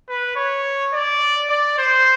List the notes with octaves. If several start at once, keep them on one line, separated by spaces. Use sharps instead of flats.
B4
C#5
D5
D5
C5